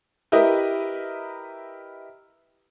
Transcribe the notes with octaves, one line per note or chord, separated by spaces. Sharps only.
E4 G4 A#4 B4 D#5 E5